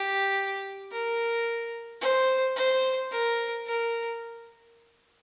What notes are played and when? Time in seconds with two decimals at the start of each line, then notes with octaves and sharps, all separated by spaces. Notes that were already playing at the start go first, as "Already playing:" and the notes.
Already playing: G4
0.92 A#4
2.01 C5
2.56 C5
3.11 A#4
3.66 A#4